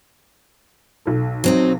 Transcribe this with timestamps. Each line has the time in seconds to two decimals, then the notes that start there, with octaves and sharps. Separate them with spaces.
1.06 B1 A4
1.44 F#3 C4 D#4